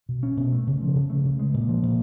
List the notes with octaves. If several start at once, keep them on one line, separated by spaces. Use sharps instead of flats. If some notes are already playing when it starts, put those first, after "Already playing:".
B2
C#4
B2
A3
C#3
F3
C#3
A3
C#3
G#3
A#2
F3
A#2